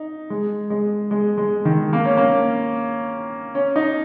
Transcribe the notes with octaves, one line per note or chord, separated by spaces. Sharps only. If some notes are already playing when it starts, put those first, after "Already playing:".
Already playing: D#4
G#3
G#3
G#3
G#3
D#3
A#3
C#4
A#3
C#4
D#4